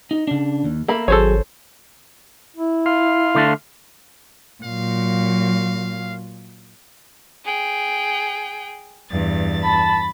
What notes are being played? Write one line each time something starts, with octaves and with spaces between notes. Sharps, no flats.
D#4
C#3 D4
D#2
A#3 A4 A#4 E5 B5
G#1 F#3 G#4 A4 C5 C#5
E4
F5 C6
D3 A3 D4
A#2 F#3 F5
G#4 G5
E2 G2 A6
A5 B5